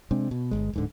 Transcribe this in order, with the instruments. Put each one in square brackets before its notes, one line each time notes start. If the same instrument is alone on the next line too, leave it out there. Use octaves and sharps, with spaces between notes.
[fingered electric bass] C3 G#3 C4 D4
B2
G1 G#3
D1 G#2 D3